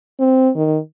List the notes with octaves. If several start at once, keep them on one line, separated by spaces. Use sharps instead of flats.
C4
D#3